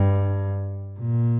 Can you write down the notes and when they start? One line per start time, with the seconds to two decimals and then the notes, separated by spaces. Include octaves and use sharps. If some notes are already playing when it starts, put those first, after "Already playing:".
Already playing: G2
1.00 A#2